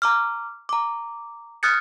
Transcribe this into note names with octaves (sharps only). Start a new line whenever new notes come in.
A#5 D6 F6
A#5 D6
D#6 F6 F#6 G#6 A6 C#7